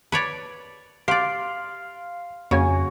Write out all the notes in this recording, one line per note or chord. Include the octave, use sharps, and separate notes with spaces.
B4 C#5 D5
G4 D5 F5 C6 C7
F2 C#3 A#3 F#4 C#5 G#5